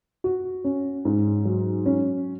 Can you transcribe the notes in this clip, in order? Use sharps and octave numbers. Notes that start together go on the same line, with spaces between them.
F#4
C#4
G#2
F#3
C#4